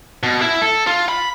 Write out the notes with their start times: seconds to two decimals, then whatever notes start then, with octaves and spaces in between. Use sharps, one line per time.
0.23 B2
0.41 E4
0.61 A4
0.87 F4
1.09 B5